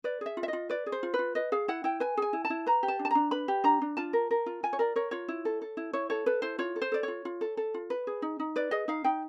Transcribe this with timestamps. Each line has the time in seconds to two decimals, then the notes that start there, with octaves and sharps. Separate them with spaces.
0.04 B4 D5
0.21 G#4 E5
0.37 F4
0.43 E5
0.48 D#5
0.53 F4
0.70 B4 D5
0.86 G#4
0.92 C5
1.03 F4
1.14 B4
1.19 F4
1.35 B4 D#5
1.52 G#4 F5
1.68 E4 F#5
1.84 E4 G5
2.00 B4 G#5
2.17 G#4 G#5
2.33 E4
2.45 A5
2.50 E4
2.66 B4 A#5
2.83 G4
2.88 A5
2.99 D4
3.05 A5
3.11 D4 A#5
3.31 B4 B5
3.48 G4
3.64 D4 A#5
3.82 D4
3.97 F4 A5
4.13 A#4
4.31 A#4
4.46 F4
4.63 F4 G#5
4.73 C#5
4.79 A#4 D5
4.96 A#4 C#5
5.11 F4 C#5
5.28 E4
5.45 A4
5.62 A4
5.77 E4
5.93 E4 C#5
6.10 A4 C#5
6.26 A4 B4
6.42 E4 C5
6.59 F4 C#5
6.76 A4
6.82 C5
6.92 A4 D5
7.03 F4 C#5
7.25 F4
7.41 A4
7.57 A4
7.74 F4
7.90 B4
8.07 G#4
8.22 D#4
8.39 D#4
8.56 B4 D5
8.71 G#4 D#5
8.88 D#4 F5
9.04 D#4 G5